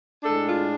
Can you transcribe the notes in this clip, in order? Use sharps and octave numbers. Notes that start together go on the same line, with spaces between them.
A2 G#3 D4 A4
F4